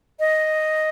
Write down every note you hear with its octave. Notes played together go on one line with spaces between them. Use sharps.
D#5